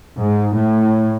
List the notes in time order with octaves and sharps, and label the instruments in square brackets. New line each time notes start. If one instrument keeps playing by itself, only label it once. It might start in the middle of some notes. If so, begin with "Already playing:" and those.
[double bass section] G#2
A2